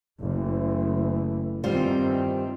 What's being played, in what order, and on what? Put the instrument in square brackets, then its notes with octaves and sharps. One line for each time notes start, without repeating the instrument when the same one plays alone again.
[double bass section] F#1 [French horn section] E3 A3
[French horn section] E2 [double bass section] G2 D#3 C4 [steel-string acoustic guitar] G3 F4 C5